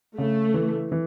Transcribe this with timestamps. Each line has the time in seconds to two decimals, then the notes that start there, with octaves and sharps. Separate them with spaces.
0.18 C#3 A3
0.54 E3
0.92 E3